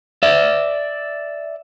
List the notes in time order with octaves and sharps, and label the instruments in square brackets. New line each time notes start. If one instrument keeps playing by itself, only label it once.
[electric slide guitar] D5 E5